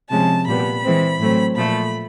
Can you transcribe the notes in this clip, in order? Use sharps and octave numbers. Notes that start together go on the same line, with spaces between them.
C3 F3 G#3 C#4 A5
A#2 G3 B3 B5
E3 G#3 C4
A2 F#3 A3 C4
A#2 F3 A3 B5